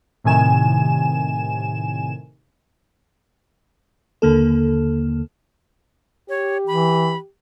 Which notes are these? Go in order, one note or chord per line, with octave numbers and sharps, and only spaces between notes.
A2 C3 D#3 G#5 E7
D#2 D3 A#3 A4
G4 C#5
E3 B5